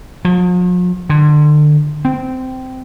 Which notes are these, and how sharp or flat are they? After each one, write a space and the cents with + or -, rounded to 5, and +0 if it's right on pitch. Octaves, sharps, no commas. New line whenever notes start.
F3 +45
D3 +30
C4 -15